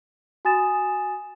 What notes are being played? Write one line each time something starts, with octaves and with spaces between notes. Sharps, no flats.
F#4 G#5 D#6 A6 E7